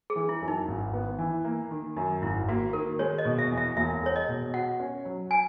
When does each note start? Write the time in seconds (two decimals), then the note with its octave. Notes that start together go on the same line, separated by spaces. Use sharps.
0.10 G#4
0.16 E3
0.29 E4
0.42 F#2
0.48 D#4
0.68 G#1
0.93 B3
1.19 E3
1.45 A#3
1.71 D#3
1.97 F#2
2.22 G#1 E4
2.49 A#3 F#4
2.73 D#3 A#4
2.99 G#3 C#5
3.18 D#5
3.25 B2
3.38 E5
3.51 E2
3.57 E5
3.77 E1 E5
4.02 G#3 C#5
4.16 D#5
4.28 B2
4.54 F#4 F#5
4.80 C#4
5.05 F#3
5.31 G#5